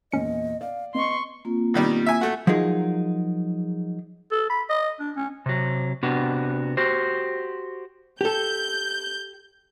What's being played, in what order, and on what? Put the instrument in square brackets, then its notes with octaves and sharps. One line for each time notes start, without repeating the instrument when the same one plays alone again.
[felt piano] E2 A#2 [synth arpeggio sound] C#4 C#7 [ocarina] D#5
[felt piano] D5 [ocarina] F5
[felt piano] B3 [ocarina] D#5 [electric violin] C6 C#6
[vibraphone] A#3 C4 F4
[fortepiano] B2 D#3 G3
E5 G#5
A3 F#4
[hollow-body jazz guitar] F3 F#3 G#3 D#4 G#4 A#4
[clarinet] A4
B5
D#5
D4
C#4
[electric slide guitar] C3 F#3
C3 B3 D4 F#4
F#4 G4 C5
[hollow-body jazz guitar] G4 A4 [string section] G6